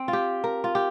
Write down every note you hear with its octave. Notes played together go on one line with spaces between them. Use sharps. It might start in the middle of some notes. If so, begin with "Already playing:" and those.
Already playing: C4
F4
G4
A#4
F4
G4